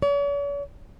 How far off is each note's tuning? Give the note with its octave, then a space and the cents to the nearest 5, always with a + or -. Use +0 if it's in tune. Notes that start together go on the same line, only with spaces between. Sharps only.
C#5 +45